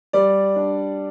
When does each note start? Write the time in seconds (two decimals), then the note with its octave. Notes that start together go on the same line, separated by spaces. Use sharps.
0.13 G3 D5
0.56 D4